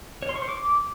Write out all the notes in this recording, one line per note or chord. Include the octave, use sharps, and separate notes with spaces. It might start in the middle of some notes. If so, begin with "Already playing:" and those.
C#5
C6
C#6
C5
D6